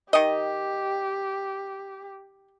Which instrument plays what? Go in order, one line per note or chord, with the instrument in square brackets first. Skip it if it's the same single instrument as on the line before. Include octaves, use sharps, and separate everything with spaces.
[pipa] D#3 D#5 [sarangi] G4